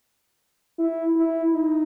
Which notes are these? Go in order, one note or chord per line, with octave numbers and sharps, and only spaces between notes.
E4
E4
D#4